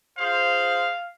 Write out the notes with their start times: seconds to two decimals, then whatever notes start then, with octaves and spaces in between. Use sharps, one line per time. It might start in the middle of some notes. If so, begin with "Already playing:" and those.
0.18 F4 G#4 C5 F5